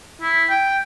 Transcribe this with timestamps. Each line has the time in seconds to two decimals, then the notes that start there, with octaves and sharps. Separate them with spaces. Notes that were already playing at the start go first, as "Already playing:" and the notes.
0.21 E4
0.50 G5